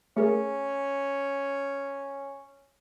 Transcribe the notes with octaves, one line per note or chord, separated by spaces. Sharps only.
A3 C#4 G#4 A#4